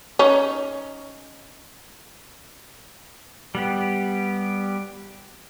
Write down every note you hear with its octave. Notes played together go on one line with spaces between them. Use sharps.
C#4 D#4
G3 B3 G4